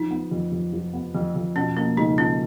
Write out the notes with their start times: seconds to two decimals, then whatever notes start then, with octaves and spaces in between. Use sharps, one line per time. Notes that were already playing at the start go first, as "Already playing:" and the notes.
Already playing: F3 D#4
0.11 B3
0.31 F2
0.52 F2
0.73 F3
0.94 B3
1.15 F2
1.36 F2
1.56 B2 C#4
1.77 A#3 C#4
1.97 C#2 D#4
2.18 C#4 F4